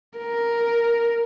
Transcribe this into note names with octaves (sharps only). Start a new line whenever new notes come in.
A#4